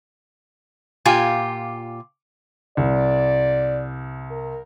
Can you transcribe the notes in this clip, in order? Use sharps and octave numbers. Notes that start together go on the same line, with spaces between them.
A#2 F4 G4 G#5
C2 D5
A#4